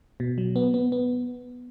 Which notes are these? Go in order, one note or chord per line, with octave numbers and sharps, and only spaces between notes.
B2
F#3
B3
B3
B3